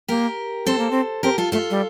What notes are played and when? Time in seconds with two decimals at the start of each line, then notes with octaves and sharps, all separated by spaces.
0.08 A#3 G4 A#4
0.66 C4 A4 C5
0.78 A#3
0.91 C4
1.23 C4 G4 A#4
1.38 F4 A4
1.52 A3 F4 A4
1.70 G3